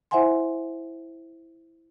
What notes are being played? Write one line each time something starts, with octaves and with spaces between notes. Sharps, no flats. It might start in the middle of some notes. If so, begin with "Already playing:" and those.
E4 C5 E5 F#5 G#5 C6